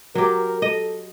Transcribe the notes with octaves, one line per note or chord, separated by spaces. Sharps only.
F#3 G4 A#4
A4 D#5